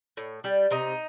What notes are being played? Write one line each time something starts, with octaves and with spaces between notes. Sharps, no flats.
A2
G3
C3 D#4